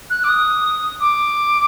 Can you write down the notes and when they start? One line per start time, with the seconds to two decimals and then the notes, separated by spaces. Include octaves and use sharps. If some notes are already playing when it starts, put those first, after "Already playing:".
0.10 F#6
0.24 D6
0.29 D#6
1.00 D6